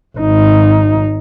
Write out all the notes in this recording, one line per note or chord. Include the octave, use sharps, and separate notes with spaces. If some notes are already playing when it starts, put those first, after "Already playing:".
G#1 D#4